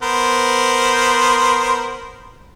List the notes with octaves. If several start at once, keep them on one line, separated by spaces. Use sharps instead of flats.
B3 A#4 C5